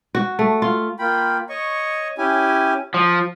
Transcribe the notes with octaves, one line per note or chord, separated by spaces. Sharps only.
F#4
A3
F4
A#3 F4 G5 B5
C#5 D#5 C#6
C#4 E4 G4 G#5
F3